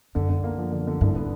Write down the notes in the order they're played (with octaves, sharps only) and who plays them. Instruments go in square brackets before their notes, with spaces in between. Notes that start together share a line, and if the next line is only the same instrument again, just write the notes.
[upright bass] F#2 [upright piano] D3
[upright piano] D3
A#3
F3
D3
D3
[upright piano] C2 [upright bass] G2
[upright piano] B3